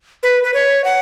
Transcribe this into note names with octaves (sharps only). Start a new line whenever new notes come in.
B4
B4
C#5
F#5